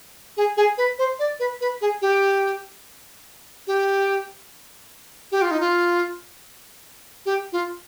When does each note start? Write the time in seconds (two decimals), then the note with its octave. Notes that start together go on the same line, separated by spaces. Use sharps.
0.37 G#4
0.57 G#4
0.78 B4
0.99 C5
1.19 D5
1.40 B4
1.61 B4
1.81 G#4
2.02 G4
3.67 G4
5.32 G4
5.42 F4
5.51 D#4
5.60 F4
7.26 G4
7.52 F4